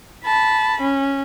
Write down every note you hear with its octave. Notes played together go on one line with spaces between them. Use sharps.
A5 B5
C#4